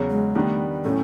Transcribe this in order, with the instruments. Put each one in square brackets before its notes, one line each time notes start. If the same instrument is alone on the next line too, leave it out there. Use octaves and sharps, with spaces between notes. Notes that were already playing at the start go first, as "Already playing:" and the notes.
Already playing: [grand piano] E2 C#3 F#3
[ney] G#3
[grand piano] D#3 G3 B3 D4 [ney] A3
[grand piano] A2 F#3 A3 [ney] C#4